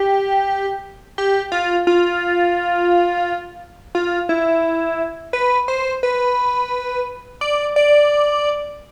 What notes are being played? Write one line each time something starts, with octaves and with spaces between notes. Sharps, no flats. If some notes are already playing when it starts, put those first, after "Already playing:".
Already playing: G4
G4
F4
F4
F4
E4
B4
C5
B4
D5
D5